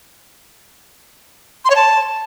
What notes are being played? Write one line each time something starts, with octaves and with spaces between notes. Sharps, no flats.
C6
C#5
A5